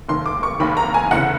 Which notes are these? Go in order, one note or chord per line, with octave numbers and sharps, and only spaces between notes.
F1 D#2 D#3 C6
D6
C#6
F1 D#2 D#3 B5
A#5
G#5
F1 E2 C#3 F#5